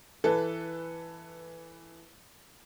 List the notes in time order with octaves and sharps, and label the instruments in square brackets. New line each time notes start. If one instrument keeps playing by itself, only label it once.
[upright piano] E3 A4 B4